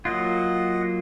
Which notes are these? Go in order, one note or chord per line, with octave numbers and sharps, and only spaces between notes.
F#3 A#3 F4 D#5 F#5